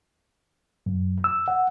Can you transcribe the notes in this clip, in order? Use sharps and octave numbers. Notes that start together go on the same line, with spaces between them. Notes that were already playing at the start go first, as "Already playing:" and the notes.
F#2
E6
F#5